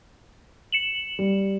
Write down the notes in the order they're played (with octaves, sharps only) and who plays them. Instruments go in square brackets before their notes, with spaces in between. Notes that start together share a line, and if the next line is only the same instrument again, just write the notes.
[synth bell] C#7 E7 F#7
[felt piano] G3